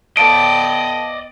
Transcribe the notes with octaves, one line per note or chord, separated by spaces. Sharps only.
B3 A4 D5 D#5 F5 G5 A5 D7